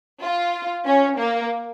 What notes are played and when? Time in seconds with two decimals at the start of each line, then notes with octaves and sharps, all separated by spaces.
0.22 F4
0.87 C#4
1.19 A#3